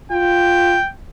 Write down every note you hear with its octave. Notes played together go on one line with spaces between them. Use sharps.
F4 G5